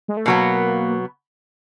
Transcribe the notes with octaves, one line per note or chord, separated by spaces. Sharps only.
G#3
A3
B2 F#3 A#3 B3